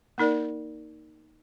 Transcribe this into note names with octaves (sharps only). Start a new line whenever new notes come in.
A#3 D#4 A#4 D5